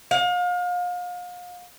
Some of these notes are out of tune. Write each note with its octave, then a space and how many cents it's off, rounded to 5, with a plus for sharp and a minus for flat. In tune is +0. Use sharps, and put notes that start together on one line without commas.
F5 +35